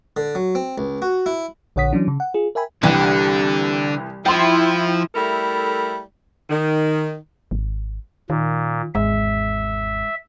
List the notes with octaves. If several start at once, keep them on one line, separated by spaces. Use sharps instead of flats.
D3
F#3
C4
C#2
F#4
E4
A#1 D3 C#5 F#5 D#6 B6
E3 F#3 C#4 D4
C#3
F#5
F4 G#4
A#4 E5 G5 G#5 B5
C2 D3 E3 G3
F3 E4 G5 C6
G3 A3 E4 A4 A#4
D#3
G#1
A#2 D#3
G#1 E2 G#3 E5